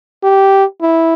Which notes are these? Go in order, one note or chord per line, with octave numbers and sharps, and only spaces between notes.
G4
E4